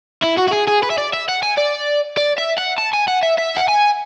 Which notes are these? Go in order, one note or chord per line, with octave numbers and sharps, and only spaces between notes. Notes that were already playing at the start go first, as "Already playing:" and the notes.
E4
F#4
F#4
G#4
G#4
B4
E5
D5
E5
F#5
G#5
D5
D5
E5
F#5
A5
G#5
F#5
E5
E5
F#5
G#5